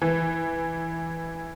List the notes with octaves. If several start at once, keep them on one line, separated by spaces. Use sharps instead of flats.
E3